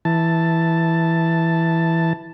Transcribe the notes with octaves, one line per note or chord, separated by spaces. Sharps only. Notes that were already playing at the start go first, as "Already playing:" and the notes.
E3 A5